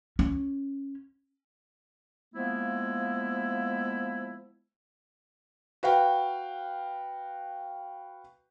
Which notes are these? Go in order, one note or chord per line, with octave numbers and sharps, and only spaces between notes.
C#4
F3 G#3 A#3 B3 E4
F#4 B4 F5 G5